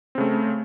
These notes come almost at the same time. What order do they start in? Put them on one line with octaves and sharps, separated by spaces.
C4 C#3 A3